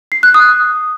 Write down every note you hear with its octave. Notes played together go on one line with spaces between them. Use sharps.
C7
F#6
D#6